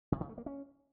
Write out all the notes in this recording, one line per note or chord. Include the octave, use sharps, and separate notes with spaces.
C3
C#3
A3
A#3
C#4